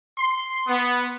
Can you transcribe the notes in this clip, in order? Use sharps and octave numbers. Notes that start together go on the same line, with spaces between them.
C6
B3